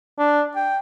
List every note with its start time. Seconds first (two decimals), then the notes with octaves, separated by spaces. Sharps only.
0.19 D4
0.56 G5